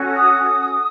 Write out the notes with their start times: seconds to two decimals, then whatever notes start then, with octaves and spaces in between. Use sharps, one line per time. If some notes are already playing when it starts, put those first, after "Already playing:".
Already playing: C#4 F#4 A4
0.13 D#6